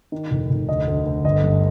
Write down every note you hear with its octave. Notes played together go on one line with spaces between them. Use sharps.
D#3
F1
F1
D2 D#5
D2
D2
G1 D#5
G2